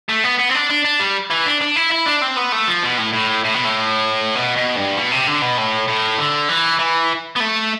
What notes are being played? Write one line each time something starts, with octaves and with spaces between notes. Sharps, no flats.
A3
B3
B3
C4
D4
D4
D4
G3
E3
D4
D4
E4
E4
D4
C4
B3
A3
F3
B2
A2
A2
A2
B2
A2
B2
B2
G2
B2
C3
D3
B2
A2
A2
D3
E3
E3
B3
A3